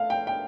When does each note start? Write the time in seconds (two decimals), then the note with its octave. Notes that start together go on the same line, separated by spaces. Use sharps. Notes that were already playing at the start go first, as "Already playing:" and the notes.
Already playing: A3 F5
0.10 G5
0.27 G5